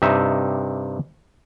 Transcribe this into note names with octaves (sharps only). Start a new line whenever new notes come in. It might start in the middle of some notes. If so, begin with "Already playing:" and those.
G2 C3 D#4 E5